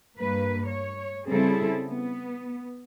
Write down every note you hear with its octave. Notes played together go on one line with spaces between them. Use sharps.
G2 A#3 B4
C#5
C#3 G3 C4 E4 G#4 A4
B3